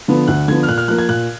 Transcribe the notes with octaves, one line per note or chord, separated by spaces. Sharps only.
D3 F3 B3
D2 F#6
D3 F3 B3 G#6
F6
A#2 F#6
F6
F3 A#3 F#6
G#6
A#2 F#6